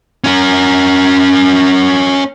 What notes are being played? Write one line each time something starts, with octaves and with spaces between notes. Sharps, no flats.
C#4 A#4